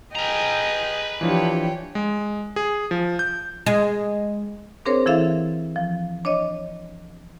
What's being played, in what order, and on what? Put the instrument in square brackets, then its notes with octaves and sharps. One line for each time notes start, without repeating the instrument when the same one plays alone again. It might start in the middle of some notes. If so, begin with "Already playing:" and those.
[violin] G#4 D#5 [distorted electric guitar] B4 A#5 [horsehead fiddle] G5
[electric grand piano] E3 F3 [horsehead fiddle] D4 G4 [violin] C#5 G5
[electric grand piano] G#3
G#4
F3
G6
[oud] G#3
[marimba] C4 D4 G#4 A#4 C5 C#5
E3 E4 A4 E5 F5
F3
D4 C#5 D#5